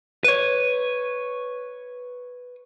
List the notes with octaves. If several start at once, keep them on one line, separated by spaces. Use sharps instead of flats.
B4 C#5